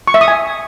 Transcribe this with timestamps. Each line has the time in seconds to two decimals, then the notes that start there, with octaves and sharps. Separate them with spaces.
0.07 C#6
0.14 E5
0.21 D#6
0.28 G#5